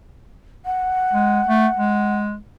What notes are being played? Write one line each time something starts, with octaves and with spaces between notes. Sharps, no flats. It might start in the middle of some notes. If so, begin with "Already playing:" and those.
F#5
G#3
A3
G#3